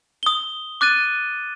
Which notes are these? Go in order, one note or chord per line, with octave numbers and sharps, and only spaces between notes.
D#6 G7
D6 F#6 A6 D#7